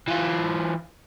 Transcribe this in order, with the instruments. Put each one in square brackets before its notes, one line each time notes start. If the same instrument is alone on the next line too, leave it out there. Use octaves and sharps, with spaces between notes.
[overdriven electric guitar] E3 F4